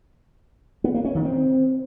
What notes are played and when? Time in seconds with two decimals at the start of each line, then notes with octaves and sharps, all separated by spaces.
0.84 B3
0.94 A#3
1.05 C#4
1.15 D#3
1.25 C4